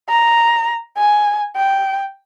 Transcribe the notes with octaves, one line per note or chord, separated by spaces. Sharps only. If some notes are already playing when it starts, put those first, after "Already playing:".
A#5
G#5
G5